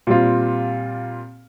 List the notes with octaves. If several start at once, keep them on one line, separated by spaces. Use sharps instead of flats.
A#2 G3 C4 F4